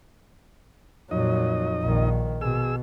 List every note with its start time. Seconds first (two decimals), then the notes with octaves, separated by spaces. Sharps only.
1.11 F2 A#2 F#3 D#4 D#5
1.83 A#1 D#3
2.41 B2 G#4 E6